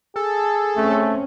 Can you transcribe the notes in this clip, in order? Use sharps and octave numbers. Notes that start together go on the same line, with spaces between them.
G#4 A4
A3 C4 C#4